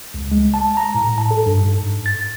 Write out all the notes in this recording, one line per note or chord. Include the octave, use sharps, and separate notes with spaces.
C#2
G#3
A5
A#5
A2
A5
A4
G2
G#2
A6